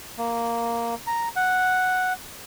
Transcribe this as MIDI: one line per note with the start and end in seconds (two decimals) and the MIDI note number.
0.18 0.95 58
1.07 1.28 82
1.36 2.13 78